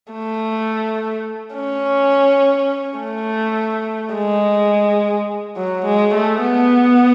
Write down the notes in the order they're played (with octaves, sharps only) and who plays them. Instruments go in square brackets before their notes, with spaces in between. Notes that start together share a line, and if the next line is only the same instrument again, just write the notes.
[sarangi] A3
C#4
A3
G#3
F#3
G#3
A3
B3